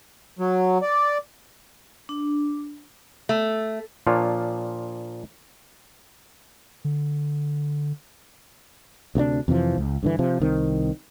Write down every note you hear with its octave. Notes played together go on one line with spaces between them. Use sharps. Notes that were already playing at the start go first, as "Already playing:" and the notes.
F#3
D5
D4
A3
A#2 F3 D4 F4 C#5
D3
D2 C3 A3 D4
F2 C3 E3 F3
C#2
G2 D3 E3
C3 F3
C2 D#3 C4